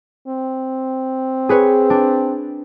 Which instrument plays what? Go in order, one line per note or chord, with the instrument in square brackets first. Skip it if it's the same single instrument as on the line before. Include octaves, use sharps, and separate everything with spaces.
[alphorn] C4
[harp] G#4 B4 C#5
D4